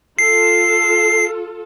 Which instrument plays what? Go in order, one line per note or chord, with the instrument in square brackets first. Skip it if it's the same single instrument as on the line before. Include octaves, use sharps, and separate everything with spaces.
[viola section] F4 A4 [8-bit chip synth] C7